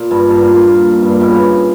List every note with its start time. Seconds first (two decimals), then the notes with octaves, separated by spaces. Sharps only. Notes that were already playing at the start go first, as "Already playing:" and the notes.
Already playing: A#2
0.11 G2
0.30 G2
0.41 A#2
0.54 A#2
1.02 G2
1.11 A#2
1.21 B2
1.30 C#3